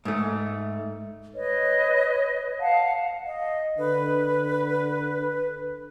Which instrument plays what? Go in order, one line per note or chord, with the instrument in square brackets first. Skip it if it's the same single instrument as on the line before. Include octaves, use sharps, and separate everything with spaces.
[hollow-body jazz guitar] G#2 A3
[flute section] B4 C#5 D#5
F5 F#5 A5
[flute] D#5
[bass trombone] D3 [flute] B4